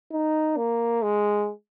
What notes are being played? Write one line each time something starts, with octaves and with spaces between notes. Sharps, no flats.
D#4
A#3
G#3